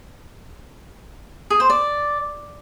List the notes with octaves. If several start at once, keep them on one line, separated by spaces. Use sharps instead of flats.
G#4
C5
D5